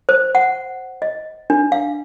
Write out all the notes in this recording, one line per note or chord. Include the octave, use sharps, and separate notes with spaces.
C5
F#5
D#5
D4
F5